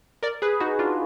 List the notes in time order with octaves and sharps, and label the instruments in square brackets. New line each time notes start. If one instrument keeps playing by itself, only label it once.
[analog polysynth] A#4 D5
G#4 B4
D#4 F#4
D4 F4